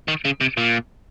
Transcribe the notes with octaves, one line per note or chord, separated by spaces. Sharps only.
D#3
C#3
C3
A#2